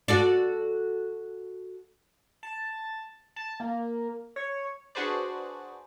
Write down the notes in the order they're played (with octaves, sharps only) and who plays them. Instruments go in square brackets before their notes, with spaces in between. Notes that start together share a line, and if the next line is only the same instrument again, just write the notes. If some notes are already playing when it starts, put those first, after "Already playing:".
[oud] F#4 A4 D5
[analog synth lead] A5
A5
A#3
C#5
[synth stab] D4 F#4 G#4 B4 C5 D5